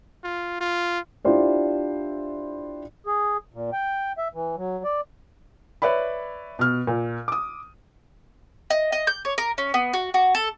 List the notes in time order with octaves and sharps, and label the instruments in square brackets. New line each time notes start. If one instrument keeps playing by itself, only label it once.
[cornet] F4
F4
[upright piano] D4 E4 F4 G4 C5 D5
[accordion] G#4
A#2
G5
E5
E3
F#3
D5
[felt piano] B4 C#5 D5 E5 B5
B2 F6
A#2
D6 D#6
[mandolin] D#5
D#5
G6
C#5
A#4
C#4
B3
F#4
F#4
A4